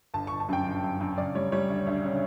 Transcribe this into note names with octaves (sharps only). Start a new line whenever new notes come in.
G1 A5
G1 C#6
A5
F#2 G5
G1
F#2
F#2
C#3 D5
G3 C#5
G3 C#5
D2
D2
C#3